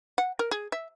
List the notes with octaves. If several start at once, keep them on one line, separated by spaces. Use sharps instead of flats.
F#5
A#4
G#4
E5